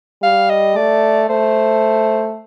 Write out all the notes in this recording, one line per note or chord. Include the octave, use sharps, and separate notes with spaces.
G3 F5
D#5
A3 D5
A3 C5